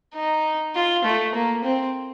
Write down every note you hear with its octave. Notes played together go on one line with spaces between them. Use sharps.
D#4
F4
A3
A#3
C4